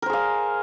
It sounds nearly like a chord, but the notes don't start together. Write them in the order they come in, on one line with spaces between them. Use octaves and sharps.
A#4 C5 G#4 F5